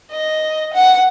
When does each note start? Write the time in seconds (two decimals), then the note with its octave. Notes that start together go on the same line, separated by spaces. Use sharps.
0.12 D#5
0.74 F#5